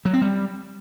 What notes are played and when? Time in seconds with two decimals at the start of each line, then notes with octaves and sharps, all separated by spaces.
0.05 F#3
0.13 C4
0.21 G3